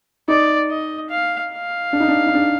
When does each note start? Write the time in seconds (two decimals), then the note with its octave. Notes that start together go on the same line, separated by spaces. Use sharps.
0.28 D#4 D5
0.70 D#5
1.10 F5
1.52 F5
1.93 D4
2.00 D#4
2.08 D4
2.27 D#4
2.35 D4